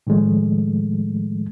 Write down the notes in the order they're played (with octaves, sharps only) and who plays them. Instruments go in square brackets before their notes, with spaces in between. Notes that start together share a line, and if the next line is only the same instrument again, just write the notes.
[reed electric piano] A2 D#3 F3 G#3 A3